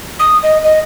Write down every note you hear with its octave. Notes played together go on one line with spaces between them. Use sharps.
D#6
D#5
D#5